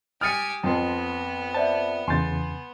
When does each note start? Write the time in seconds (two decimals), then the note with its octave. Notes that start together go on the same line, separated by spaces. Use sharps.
0.21 G4 G#5 D#6 F6 A6 C#7
0.64 F2 B3 A5 C6
1.54 C5 D5 E5 A5
2.08 E2 C#3 G#5 C6 G6 A6